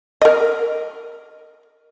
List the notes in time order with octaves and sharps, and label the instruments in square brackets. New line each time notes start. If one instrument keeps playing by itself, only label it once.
[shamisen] A#4 D#5